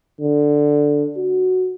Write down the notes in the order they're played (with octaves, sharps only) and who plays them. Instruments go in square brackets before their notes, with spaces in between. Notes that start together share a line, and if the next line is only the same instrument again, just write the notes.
[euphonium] D3
F#4